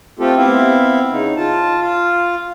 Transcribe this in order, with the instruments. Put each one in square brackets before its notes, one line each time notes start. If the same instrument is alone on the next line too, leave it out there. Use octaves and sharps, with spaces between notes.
[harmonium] A3 C4 F4 G4 A4
B3 C4 E4 E5 F5
C#3 D#4
F4 A5
F4 F5